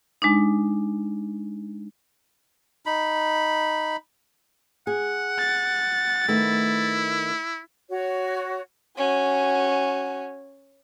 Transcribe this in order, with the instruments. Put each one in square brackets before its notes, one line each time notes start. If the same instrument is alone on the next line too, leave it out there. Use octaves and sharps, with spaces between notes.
[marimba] G#3 D4 D#4
[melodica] D#4 B5
[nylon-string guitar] G#4 [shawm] F#5
[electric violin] A6
[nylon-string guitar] D#3 A3 B3 [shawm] E4
[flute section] F#4 C#5
[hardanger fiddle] C#4 [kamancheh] F#4 G#5